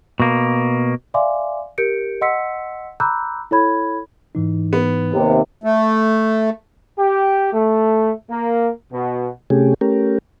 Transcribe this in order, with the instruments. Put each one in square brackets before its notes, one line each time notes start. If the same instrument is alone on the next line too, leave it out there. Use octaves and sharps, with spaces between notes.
[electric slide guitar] B2 A#3
[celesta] D5 E5 F5 G#5 C6 D6
G4 A#4 G6 C#7 D7
D#5 F#5 C6 E6 B6 C#7
A#5 B5 D6 E6 F#6 G6
E4 A4 C#5 B5 G#6
[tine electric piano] G#2 E3 D#4
[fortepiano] B3
[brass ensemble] D#2 C3
[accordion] A3
[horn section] G4
A3
A#3
B2
[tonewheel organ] C3 A3 C#4 G4 G#4
A3 C#4 G4 A#4